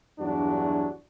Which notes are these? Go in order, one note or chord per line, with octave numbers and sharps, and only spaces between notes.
E2 G2 F#3 D4 F#4